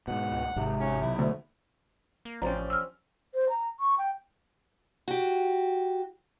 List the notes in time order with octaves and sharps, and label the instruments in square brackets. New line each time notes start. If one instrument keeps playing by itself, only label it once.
[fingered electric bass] G#2 B2 [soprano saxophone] F#5
[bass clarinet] C#2
[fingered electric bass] G#1 G#2 [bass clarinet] C3
[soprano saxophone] C#4
[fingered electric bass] B1 [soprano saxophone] E4
[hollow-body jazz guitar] D2
[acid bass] A#3
[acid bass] A1 [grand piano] F3 C#4 [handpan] G4 C5 D5 [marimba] A#5
[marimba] E6 F6
[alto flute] C5
A#5
C#6
G5
[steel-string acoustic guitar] F#4 G4